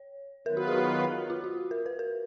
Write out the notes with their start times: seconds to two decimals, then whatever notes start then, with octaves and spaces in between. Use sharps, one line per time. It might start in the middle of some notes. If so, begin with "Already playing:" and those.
Already playing: C#5
0.46 D#3 F#3 B3 F4 A#4 B4
0.57 F#4
0.68 G#4
0.78 G#4
1.30 F4
1.44 F#4
1.71 A#4
1.86 B4
1.99 A#4